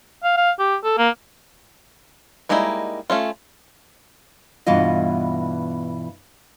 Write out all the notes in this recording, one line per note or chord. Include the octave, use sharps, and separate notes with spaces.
F5
F5
G4
A4
A#3
G3 G#3 A#3 D#4 E4
A3 C#4 F4
G2 B2 E3 F4 D#5